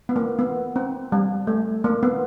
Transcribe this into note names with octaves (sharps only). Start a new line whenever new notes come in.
B3
A#3
B3
C4
G3
A3
A#3
B3